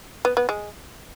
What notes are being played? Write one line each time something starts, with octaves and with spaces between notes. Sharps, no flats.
B3
B3
G#3